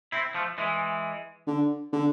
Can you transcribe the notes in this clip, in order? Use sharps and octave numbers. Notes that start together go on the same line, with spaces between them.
C4 E4
F3 A3
E3 G#3
D3
D3